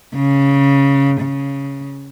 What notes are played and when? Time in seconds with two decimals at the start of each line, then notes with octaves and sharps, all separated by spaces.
0.16 C#3
1.21 C#3